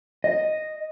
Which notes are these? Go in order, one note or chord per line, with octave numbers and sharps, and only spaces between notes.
D#5